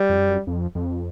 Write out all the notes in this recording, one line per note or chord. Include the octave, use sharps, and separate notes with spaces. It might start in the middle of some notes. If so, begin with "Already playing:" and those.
Already playing: G3
F2
F#2
F2
F2